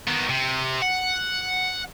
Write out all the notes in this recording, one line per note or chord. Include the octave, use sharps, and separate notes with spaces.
D#3 B3
C3
F#5